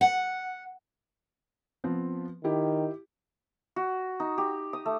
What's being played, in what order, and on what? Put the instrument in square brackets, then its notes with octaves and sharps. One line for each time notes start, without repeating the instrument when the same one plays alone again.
[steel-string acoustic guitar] F#5
[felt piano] F3 B3 C4
[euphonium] D#3 [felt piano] E4 G4
[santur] F#4
D#4
G4
D#6
A3